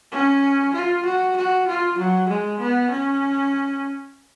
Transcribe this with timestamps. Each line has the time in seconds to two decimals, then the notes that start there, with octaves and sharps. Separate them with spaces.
0.12 C#4
0.74 F4
1.06 F#4
1.37 F#4
1.68 F4
1.98 F#3
2.29 G#3
2.60 B3
2.91 C#4